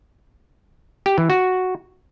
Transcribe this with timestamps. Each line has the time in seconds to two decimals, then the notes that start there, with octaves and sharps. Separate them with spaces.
1.06 G4
1.18 E3
1.30 F#4